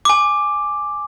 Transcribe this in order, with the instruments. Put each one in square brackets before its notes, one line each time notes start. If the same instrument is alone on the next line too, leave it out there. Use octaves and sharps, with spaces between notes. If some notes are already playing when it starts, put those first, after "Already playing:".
[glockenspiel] G#5 D6